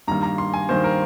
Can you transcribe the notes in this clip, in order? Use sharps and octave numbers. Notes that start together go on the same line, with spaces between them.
G2 D#3 G3 A#3 A#5
A#5
C6
G#5
G2 D#3 G3 A#3 C5
A#4